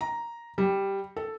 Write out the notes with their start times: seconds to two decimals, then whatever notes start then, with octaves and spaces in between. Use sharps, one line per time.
0.01 A#5
0.58 G3
1.16 A4